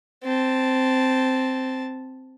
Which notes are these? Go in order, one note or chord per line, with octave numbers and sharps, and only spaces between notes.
C4 A5